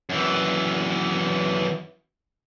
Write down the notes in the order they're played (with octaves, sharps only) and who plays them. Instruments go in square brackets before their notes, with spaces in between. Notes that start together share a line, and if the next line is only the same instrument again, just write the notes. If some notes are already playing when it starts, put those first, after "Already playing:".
[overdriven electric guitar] F#2 E3